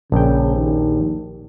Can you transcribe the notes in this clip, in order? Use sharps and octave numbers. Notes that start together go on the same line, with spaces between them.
A#1 C#3 G5
D#2